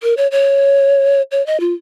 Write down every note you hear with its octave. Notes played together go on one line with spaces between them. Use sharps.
A#4
C#5
C#5
C#5
D#5
F4